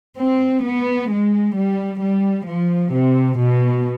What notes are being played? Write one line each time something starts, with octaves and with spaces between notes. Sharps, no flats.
C4
B3
G#3
G3
G3
F3
C3
B2